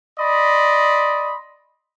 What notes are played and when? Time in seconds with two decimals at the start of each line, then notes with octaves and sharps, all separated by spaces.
0.19 D5 D#5 B5 C6